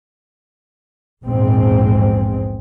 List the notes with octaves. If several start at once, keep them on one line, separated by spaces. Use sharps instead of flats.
A#1 E2 G#2 G#3 C4